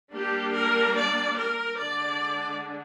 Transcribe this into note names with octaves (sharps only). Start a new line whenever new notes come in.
G3 A#3 D4 G4
A#4
D5
A#4
D3 G#3 D4 D5